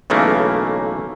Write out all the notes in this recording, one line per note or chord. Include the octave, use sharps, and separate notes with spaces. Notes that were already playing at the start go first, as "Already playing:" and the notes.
B1 C#3 E3 A3 A#3